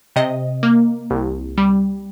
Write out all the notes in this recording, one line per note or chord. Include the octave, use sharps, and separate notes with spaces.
C3 D#5
A#3
C2
G3